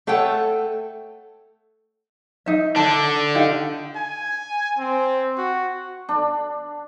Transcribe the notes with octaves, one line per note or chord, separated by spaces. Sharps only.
A3 A4 C#5 F#5 G5
D#4 E5
D3 D4 A5
D#4 G4 F5
G#5
C4
F#4
D4